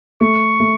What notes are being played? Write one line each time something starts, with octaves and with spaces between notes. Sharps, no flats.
A3 C#6
A3